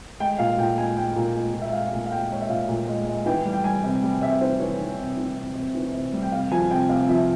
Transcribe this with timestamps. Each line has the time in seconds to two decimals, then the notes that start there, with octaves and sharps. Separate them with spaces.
0.20 G#3 G5
0.39 A#2 F5
0.58 A#2 G5
0.77 G#3 G#5
0.97 G#3 G5
1.16 A#2
1.35 G#3
1.54 A#2
1.62 E5
1.73 G#3 F5
1.93 A#2
2.06 F5
2.11 G#3 G5
2.30 G#3 C#5
2.41 E5
2.49 A#2 F5
2.69 A#2
2.88 G#3
3.07 G#3
3.26 E3 G5
3.45 G3
3.53 G5
3.64 G3 G#5
3.84 C3
4.03 G3
4.22 C3 E5
4.41 E3 C5
4.60 E3 C#5
4.79 E3
4.99 C3
5.17 E3
5.36 C3
5.55 C3
5.75 E3
5.94 C3
6.13 G3
6.22 G5
6.32 C3 F5
6.51 F3 G#5
6.70 C3 G5
6.89 C3 F5
7.09 F3 E5